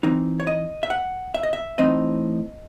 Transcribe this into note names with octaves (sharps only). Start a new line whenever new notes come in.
E3 C4 D#4
C#5
D#5
E5
F#5
E5
D#5
E5
A2 E3 C4 D#4 D#5